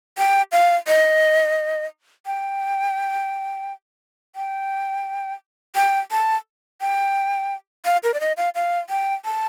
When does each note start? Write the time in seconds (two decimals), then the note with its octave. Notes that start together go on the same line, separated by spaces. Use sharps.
0.18 G5
0.52 F5
0.87 D#5
2.26 G5
4.36 G5
5.75 G5
6.11 A5
6.81 G5
7.85 F5
8.04 A#4
8.14 D5
8.20 D#5
8.37 F5
8.55 F5
8.90 G5
9.25 A5